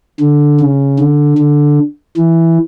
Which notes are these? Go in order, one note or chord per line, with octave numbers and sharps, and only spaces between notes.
D3
C#3
D3
D3
E3